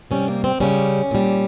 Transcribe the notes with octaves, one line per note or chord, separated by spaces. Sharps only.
C3 G3 C#4
A#3
C4
C#3 G3 C#4
A#2 G3